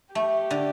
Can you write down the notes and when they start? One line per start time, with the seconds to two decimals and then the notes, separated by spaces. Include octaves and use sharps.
0.15 A3 G4
0.51 D3